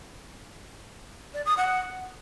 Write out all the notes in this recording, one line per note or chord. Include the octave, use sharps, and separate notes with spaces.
D5
D#6
F#5